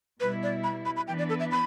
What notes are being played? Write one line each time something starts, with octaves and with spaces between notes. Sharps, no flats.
B2 G3 E4 B4
D5
B5
B5
B5
E3 B3 D4 B4 G5
D5
A4
E5
B5